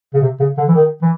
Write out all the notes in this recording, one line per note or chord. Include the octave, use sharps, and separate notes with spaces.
C#3
C3
C#3
D3
E3
D#3
E3